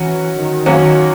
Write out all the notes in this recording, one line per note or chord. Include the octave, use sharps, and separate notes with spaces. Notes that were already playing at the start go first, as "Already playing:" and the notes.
Already playing: E3 F#3 C#4 F#4
D#3
F#3 A#3 C#4 F#4